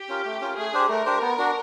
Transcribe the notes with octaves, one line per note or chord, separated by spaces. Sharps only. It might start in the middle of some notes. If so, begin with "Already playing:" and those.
Already playing: G4
C#4 F4 A#4
A3
C#4 F4 A#4
A3 G#4
D4 G4 C5
A3 A#4
D4 G4 C5
B3
D4 F#4